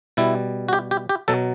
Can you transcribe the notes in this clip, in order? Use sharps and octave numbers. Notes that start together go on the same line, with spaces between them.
B2 G3 E4
F#4
G4
G4
G4
B2 F#3 A4